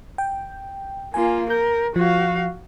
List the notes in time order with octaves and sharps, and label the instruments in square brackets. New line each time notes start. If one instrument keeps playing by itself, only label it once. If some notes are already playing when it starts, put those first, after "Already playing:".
[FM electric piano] G5
[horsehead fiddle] A#3 F4 [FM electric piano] G#5
[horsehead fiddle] A#4 [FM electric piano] G6
[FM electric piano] F3 [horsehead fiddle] F#4 F5